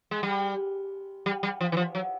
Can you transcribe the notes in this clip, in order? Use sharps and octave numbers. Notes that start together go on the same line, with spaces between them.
G#3
G3
G3
G3
F3
E3
F3
F#3